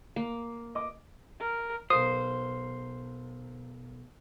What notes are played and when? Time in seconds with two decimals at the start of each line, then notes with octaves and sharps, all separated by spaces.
0.16 A#3
0.75 D#5 D6
1.40 A#4
1.90 B1 A#4 C5 F5 D#6